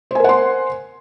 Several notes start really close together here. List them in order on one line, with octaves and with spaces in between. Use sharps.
C5 G#5 A#4 F#5 C6